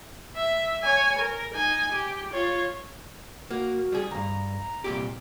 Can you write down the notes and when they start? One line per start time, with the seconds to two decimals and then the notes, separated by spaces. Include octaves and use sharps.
0.36 E5
0.83 C#5 G#5
1.19 A#4
1.54 D#4 G#5
1.92 G4
2.32 F4 C#5
3.51 A#3 F#4
3.92 G3 G#4
4.11 D2 G2 A#5
4.84 C2 A#2 G4